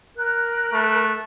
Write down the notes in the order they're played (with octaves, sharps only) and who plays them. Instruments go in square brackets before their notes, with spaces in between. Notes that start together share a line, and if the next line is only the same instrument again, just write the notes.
[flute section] A#4 F#6
[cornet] A3